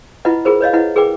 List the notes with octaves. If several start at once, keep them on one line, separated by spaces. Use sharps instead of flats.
E4 F4 B4 D#5 F#5
F4 G#4 A#4 C5
B4 C#5 D#5 F5
E4 B4 D#5 F#5
G#4 A#4 B4 G5 D6